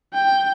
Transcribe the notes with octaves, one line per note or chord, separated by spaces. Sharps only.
G5